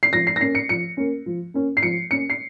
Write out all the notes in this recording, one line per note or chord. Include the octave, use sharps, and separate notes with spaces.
C7
F3 A#6
C7
A#6
A#3 C#4 C7
C#7
F3 C#7
A#3 C#4
F3
A#3 C#4
C7
F3 C#7
A#3 C#4 C#7
C7